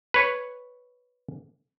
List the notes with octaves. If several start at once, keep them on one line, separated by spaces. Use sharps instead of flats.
B4 C#5